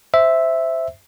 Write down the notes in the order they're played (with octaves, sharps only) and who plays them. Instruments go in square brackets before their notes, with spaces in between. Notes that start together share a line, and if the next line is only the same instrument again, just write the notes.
[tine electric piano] C5 E5